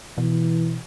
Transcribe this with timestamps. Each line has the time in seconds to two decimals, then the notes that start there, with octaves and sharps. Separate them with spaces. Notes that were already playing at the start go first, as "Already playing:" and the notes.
0.18 B2 E3